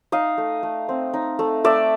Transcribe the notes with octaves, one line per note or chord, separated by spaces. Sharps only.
D#4 D#5 F5
A3
A3
C4
D#4
A3
A3 D5 E5